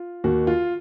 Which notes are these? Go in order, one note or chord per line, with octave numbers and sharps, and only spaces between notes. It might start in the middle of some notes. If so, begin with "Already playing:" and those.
Already playing: F4
D#2 D#3 F#4
F4